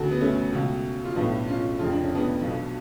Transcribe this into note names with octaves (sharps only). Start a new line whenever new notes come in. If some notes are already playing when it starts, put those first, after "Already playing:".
Already playing: D2 C#3 F#4 A4
B3
A3 C#4
C#2 B2
F4
B1 A2 B3 D4
C#4 F4
F1 F2 C#3 F4
D4
C#4
B3 D4
B1 B2